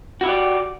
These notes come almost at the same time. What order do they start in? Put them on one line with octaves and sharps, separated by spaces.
F#4 E4 G4 D5